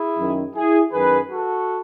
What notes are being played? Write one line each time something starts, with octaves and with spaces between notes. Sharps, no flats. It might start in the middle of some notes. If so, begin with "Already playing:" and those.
Already playing: E4 G#4
F#2 D#3
E4 G#4
F#2 D#3 G#4 B4
F#4 A4